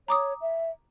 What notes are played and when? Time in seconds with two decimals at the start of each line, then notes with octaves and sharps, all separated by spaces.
0.08 C#5 A#5 D6 D#6
0.41 E5